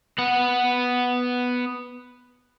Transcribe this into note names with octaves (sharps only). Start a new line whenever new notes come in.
B3 F#5